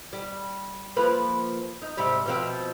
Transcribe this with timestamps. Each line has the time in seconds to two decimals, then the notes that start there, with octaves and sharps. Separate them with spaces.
0.13 G3
0.96 F3 A#3 B4
1.82 D#4
1.97 G#2 C3 G3
2.26 B2 F3 C4